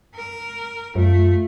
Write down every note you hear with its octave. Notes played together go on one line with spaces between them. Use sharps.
A#4
F#2 A3 F4